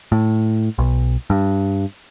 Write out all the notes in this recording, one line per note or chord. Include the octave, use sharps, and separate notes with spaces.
A2
B1
G2